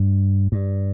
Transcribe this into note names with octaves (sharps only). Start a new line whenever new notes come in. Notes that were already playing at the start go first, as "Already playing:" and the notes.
Already playing: G2
G2